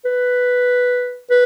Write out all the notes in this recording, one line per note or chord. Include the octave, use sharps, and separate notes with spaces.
B4
B4